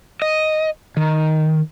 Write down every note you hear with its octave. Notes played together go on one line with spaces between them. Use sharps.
D#5
D#3